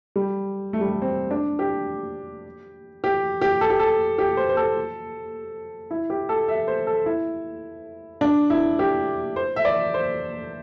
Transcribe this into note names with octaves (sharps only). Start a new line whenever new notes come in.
G3
A3
G3
A3
C4
D4
G4
G4
G4
A4
G4
A4
G4
C5
C5
A4
E4
G4
A4
E5
C5
A4
E4
D4
E4
G4
C5
E5
D5
C5